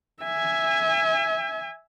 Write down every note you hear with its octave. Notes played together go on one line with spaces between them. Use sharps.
E5 G#5